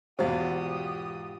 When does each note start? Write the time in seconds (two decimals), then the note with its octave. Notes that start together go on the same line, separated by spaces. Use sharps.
0.19 E2 G#2 B2 F4 G4 C5 F5 D#6